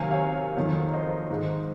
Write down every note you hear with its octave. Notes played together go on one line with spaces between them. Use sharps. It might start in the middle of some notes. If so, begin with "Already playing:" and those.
Already playing: C3 D#3 F#3 A#3 F5 G#5
C#5 F5
F2 D#3 F#3 A#3
C5 D#5
G#2 D#3 G#3